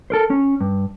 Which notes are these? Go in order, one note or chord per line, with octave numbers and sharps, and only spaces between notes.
A4 A#4 C5
C#4
G2